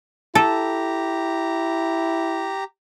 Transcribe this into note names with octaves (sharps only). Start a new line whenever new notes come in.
E4 G4 A4 A#5